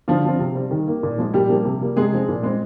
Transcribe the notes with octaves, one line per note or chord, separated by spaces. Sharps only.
D3 F3 F4
F3 C4
C3
G3 C4
D#3
A#3
A#2
F3 G#3
A#2 G3 G4
F3 A#3
C3
G3 A#3
C3 G#3 G#4
F3 C4
A#2
G#3 C4